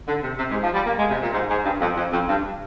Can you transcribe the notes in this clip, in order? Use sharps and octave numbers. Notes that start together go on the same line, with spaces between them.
D3
C3
C3
G#2
F3
G3
A#3
G#3
C3
A#2
G#2
G#2
G2
F2
F2
F2
G2